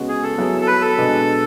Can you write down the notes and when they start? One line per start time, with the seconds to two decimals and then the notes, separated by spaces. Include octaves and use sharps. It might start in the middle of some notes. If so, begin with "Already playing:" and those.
Already playing: C#3 G#3 B3 F#4
0.09 G#4
0.23 A4
0.38 F#3 B3 E4 G#4
0.61 A4
0.67 B4
0.82 A4
0.96 B2 G#3 D4 G#4 B4